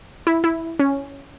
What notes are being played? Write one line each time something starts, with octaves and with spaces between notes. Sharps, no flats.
E4
E4
C#4